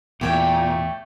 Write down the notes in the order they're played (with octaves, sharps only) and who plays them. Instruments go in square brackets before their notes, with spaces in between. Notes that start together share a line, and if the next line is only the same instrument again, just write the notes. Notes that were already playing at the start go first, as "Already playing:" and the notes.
[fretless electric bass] E2 [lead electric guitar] A#2 [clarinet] A3 [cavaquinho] G4 C#5 G5